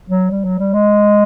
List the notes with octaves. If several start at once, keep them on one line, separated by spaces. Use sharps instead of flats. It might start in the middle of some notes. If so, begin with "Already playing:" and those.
F#3
G3
F#3
G3
G#3